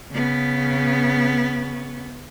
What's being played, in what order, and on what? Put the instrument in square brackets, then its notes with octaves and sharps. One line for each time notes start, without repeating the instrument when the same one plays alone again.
[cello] C#3 B3